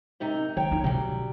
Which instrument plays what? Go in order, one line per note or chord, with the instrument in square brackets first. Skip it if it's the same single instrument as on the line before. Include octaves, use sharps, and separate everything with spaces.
[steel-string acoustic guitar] F#2 C3 D#4
[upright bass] D#3 [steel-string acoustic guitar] C#5 G5 A#5
[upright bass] D#4 F4
[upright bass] B2 D3 [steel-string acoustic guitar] F#3 G3